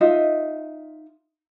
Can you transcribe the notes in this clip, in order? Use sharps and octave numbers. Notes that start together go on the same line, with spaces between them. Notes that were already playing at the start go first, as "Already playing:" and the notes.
D#4 F4 D#5 E5